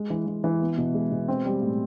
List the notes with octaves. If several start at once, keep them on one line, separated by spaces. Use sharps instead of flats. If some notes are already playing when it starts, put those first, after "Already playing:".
Already playing: G#3
E3
E3
E3
B3
B2
G#3
B2
C4
G3
A2